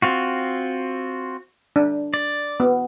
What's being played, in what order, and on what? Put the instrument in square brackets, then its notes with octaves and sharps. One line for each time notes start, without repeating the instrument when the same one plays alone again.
[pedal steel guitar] C4 F4 F#4
[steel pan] D4
[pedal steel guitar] D5
[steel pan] B3